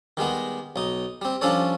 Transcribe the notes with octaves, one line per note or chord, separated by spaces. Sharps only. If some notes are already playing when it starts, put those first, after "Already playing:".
D#3 G3 G#3 B3
B1 D#4
G3 C4
F3 G3 C#4 D4 A4 C#5